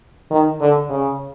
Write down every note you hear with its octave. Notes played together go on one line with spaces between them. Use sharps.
D#3
D3
C#3